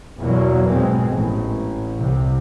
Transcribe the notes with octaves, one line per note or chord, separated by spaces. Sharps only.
E2 B2 F#3 A#3
A#1 G#2 B2 G#3 C4
A1
C2 C3